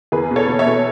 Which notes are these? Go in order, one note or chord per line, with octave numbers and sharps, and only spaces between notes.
E2 G#4 B4
B2
A4 C#5
B2
C#5 E5
B2